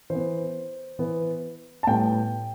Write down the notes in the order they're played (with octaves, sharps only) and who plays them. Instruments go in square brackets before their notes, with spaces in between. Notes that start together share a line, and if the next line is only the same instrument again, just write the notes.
[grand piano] E3 C5
B3
E3 B3
A5
A2 G3 B3 G5